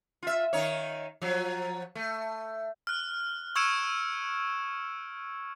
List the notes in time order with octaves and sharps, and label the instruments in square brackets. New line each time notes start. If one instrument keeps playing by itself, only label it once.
[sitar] F4 E5
D#3 D#4 C#5
F3 F#3
A3
[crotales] F6 F#6
C#6 E6 G#6 C#7 D7 E7